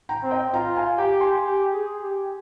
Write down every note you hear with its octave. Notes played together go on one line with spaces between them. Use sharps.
G5 A#5
C4
D#5 G5
F4 G5 A#5
F5 G#5
G4 G5 A#5
G#5 C6
G4
G#4
G4